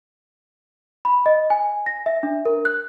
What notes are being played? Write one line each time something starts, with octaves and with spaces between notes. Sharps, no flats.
B5
D#5
G#5
A#6
E5
D4
A#4
F#6